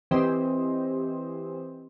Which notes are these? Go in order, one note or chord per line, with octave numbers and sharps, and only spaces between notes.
E3 C4 G4 C5 D#5